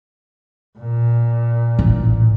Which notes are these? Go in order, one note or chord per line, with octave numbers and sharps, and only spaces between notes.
A#2
A1